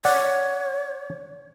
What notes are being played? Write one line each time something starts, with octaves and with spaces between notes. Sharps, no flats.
C#5 D5 F#5